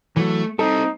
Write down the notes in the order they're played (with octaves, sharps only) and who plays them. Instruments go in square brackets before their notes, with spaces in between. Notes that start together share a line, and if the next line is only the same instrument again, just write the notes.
[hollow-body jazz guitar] E3 F#3 [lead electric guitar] A3
[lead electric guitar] G3 C4 [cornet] D#4 [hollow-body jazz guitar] A4